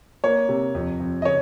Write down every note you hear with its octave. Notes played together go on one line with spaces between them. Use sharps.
A#3 C#5
C3
F2
F2
D#5
C#3 C#5